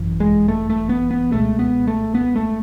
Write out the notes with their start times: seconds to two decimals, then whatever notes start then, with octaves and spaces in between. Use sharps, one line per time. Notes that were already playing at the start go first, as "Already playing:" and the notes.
Already playing: G#1 F#2 E3
0.20 G#3
0.48 A3
0.70 A3
0.89 B3
1.11 B3
1.32 C#2 B2 G#3 A3
1.59 B3
1.87 A3
2.15 B3
2.36 A3